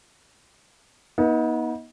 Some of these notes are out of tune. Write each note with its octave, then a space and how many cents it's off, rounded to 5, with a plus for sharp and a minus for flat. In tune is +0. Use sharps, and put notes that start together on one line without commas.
B3 -35 D#4 +30